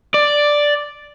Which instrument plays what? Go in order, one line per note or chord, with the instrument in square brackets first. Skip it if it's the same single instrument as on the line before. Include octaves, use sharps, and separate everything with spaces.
[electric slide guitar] D5